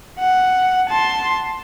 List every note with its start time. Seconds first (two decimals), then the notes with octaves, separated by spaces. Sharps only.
0.19 F#5
0.89 A5 C6